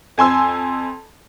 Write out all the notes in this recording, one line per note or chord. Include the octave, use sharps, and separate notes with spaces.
F2 G#5 C6 E6